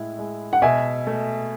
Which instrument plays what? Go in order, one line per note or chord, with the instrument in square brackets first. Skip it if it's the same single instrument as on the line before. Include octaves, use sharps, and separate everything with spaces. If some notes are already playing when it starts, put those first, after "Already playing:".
Already playing: [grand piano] A2 G#3 E4
G#3
[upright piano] F#5
[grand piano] B2 [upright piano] E5 G#5
[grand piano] A3